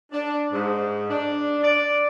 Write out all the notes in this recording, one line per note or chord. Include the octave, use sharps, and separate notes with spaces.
D4
G#2
D4
D5